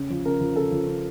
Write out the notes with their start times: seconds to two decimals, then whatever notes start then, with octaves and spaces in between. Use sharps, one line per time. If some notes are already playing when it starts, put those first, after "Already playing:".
Already playing: C#3
0.10 F3
0.25 C#3 A#4
0.40 F3
0.56 C#3 A4
0.72 F3
0.87 C#3